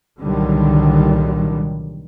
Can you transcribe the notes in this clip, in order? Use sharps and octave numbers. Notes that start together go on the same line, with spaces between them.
C2 A#2 D3 D#3 F#3 G3